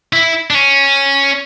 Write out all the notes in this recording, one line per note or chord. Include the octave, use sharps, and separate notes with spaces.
E4
D4
C#4